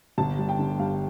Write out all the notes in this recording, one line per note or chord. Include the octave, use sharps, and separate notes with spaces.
G1 A5
G3
G5
D3
G2 F5